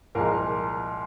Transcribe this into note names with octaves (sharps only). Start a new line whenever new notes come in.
C2 A#2 F3 G#3 A#4